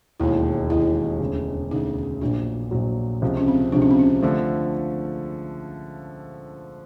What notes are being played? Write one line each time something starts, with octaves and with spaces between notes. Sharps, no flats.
E1 D#2 D#3 G#3 E4
E1 D#2 D#3 G#3 E4
E1 D2 C#3
E1 D2 C#3 D#4
A#1 A#2 F#3 D4
A#1 A#2 F#3
C#2 C3 F3
C#4
C4
C#2 C3 F3 D4
C#4
C4
C#4
D3 F3 A3 D4